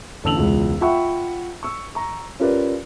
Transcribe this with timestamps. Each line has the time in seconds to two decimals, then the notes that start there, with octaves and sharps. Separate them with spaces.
0.24 A1 D3 A5 E6 F7 F#7
0.37 E1 C#2 F4
0.81 F4 E5 F#5 G5 B5 C#6
1.63 C#6 E6
1.95 A#5 C#6
2.40 C#4 F4 G4 A#4 B4 D5